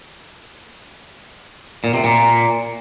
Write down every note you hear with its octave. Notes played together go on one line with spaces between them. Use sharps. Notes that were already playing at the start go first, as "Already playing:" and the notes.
A#2
C3
A#2